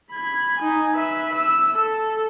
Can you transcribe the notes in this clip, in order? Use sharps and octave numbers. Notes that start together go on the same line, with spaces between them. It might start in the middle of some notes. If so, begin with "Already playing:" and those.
B5 G#6
D#4 G#5
B4 E5
E6
A4